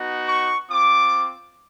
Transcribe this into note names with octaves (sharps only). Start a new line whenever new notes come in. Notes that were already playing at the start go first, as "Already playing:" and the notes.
Already playing: B3 D#4 F#4
C#6
C4 F4 D6